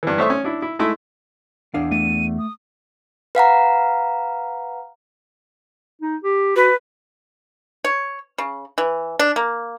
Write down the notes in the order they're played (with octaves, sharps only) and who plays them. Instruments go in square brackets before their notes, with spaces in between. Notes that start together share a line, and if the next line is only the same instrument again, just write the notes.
[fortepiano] G2 E3
A3 C5 C#5 E5 C#6 D#6
C#4
D4 E4
E4
G#3 A3 E4
[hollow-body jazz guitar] E2 D4 F5
[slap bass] A3 [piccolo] D#7
[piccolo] D#6
[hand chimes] B4 F5 F#5 A#5
[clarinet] D#4
G4
[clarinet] F#4 [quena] B4
[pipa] C#5
C#3
E3
D4
A#3